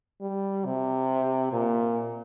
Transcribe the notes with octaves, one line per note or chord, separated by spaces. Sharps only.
G3
C3
A#2